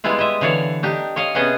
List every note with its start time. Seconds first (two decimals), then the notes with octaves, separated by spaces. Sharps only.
0.04 G3 G#3 B3 E4 F4
0.19 D#5 E5
0.41 D3 E3 C#5 D5 F5
0.83 D4 D#4 G4
1.16 C#5 D#5 F5
1.35 C3 B3 C#4 G#4 D#5